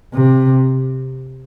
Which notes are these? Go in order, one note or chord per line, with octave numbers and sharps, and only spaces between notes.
C3